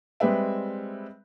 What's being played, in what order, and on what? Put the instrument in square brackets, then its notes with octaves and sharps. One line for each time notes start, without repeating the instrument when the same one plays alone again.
[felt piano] G3 G#3 C4 B4 E5